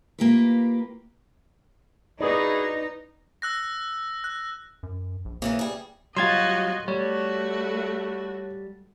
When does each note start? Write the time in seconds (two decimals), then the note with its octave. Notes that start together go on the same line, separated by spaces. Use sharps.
0.19 A#3 F4 G4 A#4 B4
2.21 D#4 E4 F#4 G#4 B4 D5
3.42 E6 F#6 A#6
4.24 F#6
4.83 F#2
5.25 A#1
5.42 C#3 E3 A#3 A#4
5.59 G3 G#4
6.17 F#3 G3 F4 F#4 D#5 C6 G#6 A6
6.88 G3 A3 F#4 C#5